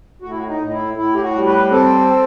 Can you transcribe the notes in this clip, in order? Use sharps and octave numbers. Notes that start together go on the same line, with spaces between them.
A2 F#4
E4
F#4
D#4
A2
D#4
E4
A2 E4
G4
F#4
G3
B4
C4 A4